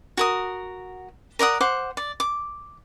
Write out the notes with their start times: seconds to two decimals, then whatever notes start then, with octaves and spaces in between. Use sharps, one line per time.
0.17 F#4 A#4 D#6
1.39 A#4 D5 F#5 D#6
1.61 C5 F#5 D6
1.97 D5
2.20 D6